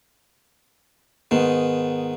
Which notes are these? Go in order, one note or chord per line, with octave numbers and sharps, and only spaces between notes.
G#2 D#3 B3